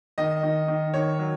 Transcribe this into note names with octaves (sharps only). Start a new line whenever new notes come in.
D#3 D#5
D#3
D#3
D#3 C#5
F#3